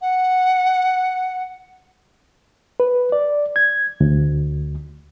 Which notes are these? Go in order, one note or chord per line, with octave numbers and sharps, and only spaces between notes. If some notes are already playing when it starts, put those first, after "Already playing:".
F#5
B4
D5
G#6
D2